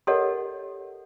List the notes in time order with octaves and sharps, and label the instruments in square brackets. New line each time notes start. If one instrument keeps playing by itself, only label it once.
[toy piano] G4 A4 A#4 C#5 D#5 F#5